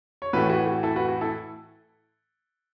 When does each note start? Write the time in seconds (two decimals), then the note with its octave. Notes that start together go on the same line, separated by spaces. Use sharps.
0.22 C#5
0.33 A2 E3 A3 F#4 B4
0.49 F#4 B4
0.67 F#4
0.83 E4 A4
0.96 F#4 B4
1.08 F#4
1.21 E4 A4